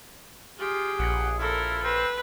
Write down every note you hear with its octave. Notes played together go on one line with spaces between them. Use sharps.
F4 G4 G#4
A#1 F#5
E4 F4 A4 A#4
C4 B4